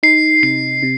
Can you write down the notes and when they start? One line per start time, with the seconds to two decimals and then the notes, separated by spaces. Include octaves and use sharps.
0.03 D#4 C7
0.43 C3 C7
0.83 C3